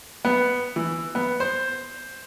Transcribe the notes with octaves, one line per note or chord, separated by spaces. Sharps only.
B3
E3
B3
C5